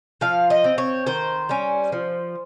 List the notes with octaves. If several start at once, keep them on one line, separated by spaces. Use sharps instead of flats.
F3 F5
D#5
C4
C#5
D#3 C5
G3 C#4
F3